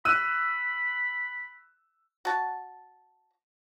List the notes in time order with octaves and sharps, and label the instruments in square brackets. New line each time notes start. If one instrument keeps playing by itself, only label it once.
[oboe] B5 [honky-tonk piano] E6 F#6 D#7
[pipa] F#4 A5